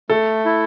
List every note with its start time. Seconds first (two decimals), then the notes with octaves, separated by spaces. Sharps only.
0.10 A3 A4
0.45 E4